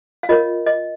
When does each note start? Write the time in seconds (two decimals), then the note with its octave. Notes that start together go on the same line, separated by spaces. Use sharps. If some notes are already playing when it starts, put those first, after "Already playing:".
0.23 F5
0.29 F4 A#4 C#5 D#5
0.66 D#5